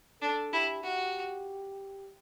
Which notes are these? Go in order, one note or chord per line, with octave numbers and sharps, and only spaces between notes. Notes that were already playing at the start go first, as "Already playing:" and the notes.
D4 A4
E4 G4
F#4 G4